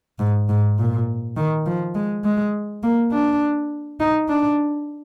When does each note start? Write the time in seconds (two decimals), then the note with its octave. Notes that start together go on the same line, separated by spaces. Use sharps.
0.19 G#2
0.49 G#2
0.78 A#2
1.37 D#3
1.66 F3
1.95 G#3
2.24 G#3
2.83 A#3
3.12 D4
4.00 D#4
4.29 D4